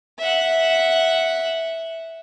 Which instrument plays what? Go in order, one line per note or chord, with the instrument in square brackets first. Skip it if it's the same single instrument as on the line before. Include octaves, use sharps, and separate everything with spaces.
[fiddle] E5 F#5